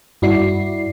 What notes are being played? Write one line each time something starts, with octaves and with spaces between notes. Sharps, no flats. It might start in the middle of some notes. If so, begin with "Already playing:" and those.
G2 E4 F#4 D5 C7